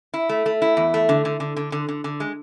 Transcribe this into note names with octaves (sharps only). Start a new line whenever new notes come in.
E4
A3
A3
E4
E2
A3
D3
D3
D3
D3
D3
D3
D3
G#3